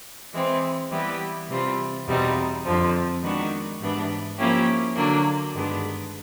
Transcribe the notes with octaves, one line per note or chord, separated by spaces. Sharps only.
E3 G#3 C4
E3 G3 B3 E4 G4
C3 E3 G3 C4 F4
E2 B2 G3 C4 D#4
F2 D3 F3
D#3 G#3 B3 D4 F#4
G#2 E3 G3 B3 D4
F3 A#3 C#4 E4 G4
D3 F#3 A#3 D4
G2 D#3 G#3 B3 D4